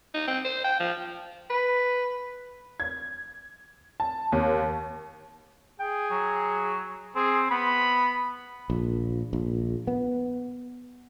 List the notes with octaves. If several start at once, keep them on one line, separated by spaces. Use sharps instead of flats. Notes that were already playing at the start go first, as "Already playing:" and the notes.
D#4
C4
C5
G5
F3
B4
G#6
A5
D#2
G#4 G5
F#3
C4 G#4
B3 B5
A#1
A#1
B3